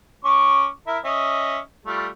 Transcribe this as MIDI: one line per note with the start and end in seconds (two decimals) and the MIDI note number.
0.25 0.68 61
0.25 0.68 85
0.25 0.68 86
0.87 0.98 64
0.87 0.98 70
0.87 0.98 76
1.04 1.58 61
1.04 1.58 75
1.04 1.58 76
1.85 2.07 55
1.85 2.07 57
1.85 2.07 65